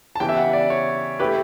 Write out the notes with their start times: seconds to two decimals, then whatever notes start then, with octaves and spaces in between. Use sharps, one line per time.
0.15 A5
0.20 C#3 E3 B3 E4 G4 G5
0.29 E5
0.37 F#5
0.53 D5
0.70 C#5
1.20 A3 E4 G4 B4